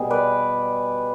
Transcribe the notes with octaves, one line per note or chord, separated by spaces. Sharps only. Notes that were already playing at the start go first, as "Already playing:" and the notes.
Already playing: B2 G3 G#4
B4 D5